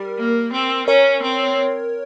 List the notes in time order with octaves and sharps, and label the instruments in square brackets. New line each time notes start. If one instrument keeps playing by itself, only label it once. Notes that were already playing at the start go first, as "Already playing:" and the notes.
Already playing: [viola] G3 [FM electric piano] A#4
[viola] A#3
C4
[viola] C#4 [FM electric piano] A#4 C#5
[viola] C4